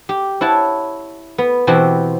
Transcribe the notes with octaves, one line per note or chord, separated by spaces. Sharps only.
G4
E4 C#5 F#5 A5
B3
B2 E3 C4 F#4 G4